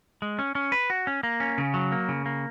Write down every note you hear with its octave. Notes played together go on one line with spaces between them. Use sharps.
G#3
C#4
C#4
B4
F#4
C#4
A#3
C#4
C#3
F#3
A#3
C#3
A#3